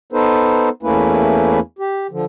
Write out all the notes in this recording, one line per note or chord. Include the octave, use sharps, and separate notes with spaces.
B3 D#4 A4 B4 C5
E2 A3 A#3 C#4 E4 B4
G4
D3 F3